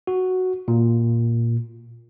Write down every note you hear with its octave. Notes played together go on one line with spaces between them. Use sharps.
F#4
A#2